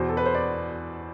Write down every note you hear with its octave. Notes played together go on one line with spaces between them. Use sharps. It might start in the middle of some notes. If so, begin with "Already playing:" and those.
Already playing: E2 B2 C5
A4
B4
C5
D5